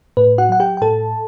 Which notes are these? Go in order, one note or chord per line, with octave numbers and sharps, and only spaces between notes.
A2 B4
F#4 F#5
F#3 F#5
G4 G5
G5
A2 A4 A5